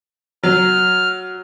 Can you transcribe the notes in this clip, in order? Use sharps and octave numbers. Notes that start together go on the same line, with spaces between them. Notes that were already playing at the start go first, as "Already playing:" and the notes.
F#3 F6